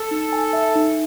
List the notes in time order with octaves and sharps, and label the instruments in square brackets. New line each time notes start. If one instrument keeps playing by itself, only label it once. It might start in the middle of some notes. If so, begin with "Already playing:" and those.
Already playing: [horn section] A4
[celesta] D#4
G#5
E5
D#4